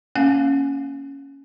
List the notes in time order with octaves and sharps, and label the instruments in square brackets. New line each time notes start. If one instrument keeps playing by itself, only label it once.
[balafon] A#3 C#4 F5 G#5